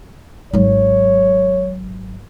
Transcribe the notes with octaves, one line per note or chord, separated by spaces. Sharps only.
G#1 F#3 C#5